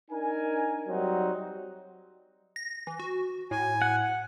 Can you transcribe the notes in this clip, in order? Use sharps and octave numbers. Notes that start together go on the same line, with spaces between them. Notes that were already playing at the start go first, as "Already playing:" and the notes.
D4 D#4 A#4 G#5
F#3 G3 C4 D#4 F#4
A#6
E3
F#4
A2 G#5
F#5